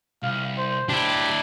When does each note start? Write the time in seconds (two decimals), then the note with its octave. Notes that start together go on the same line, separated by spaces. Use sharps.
0.23 C2 F5
0.58 C5
0.89 D4 E4 G4